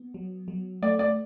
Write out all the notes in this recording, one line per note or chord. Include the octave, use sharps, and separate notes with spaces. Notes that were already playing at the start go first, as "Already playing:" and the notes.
Already playing: B3
F#3
F#3
A3 D5
D5